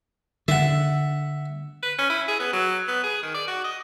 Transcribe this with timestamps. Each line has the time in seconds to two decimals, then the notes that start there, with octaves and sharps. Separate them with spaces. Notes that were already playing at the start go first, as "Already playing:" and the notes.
0.48 D3 E5 F#5
1.83 B4
1.98 C#4
2.10 E4
2.28 G#4
2.40 B3
2.53 F#3
2.88 B3
3.04 G#4
3.23 D#3
3.34 D5
3.48 F#4
3.64 D#5